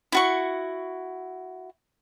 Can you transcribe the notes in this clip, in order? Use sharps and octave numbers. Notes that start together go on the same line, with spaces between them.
E4 F#4 C#6